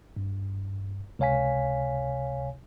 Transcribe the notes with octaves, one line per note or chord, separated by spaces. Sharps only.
G2
C#2 C3 C#5 F5 G#5 B6